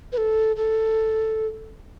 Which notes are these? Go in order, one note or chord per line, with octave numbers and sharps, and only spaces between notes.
B4
A4
A4